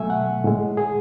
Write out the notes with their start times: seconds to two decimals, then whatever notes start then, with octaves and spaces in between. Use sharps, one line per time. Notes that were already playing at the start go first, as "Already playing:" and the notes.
Already playing: B2 F#3 A3 E5 G#5
0.10 F#5
0.44 A2 G#3
0.77 G#4